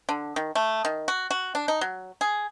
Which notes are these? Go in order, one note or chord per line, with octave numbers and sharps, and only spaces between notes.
D3
D#3
A3
D#3
F#4
F#4
D4
D#4
F#3
G#4